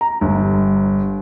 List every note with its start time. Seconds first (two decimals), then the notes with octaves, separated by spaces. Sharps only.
0.01 A#5
0.21 G1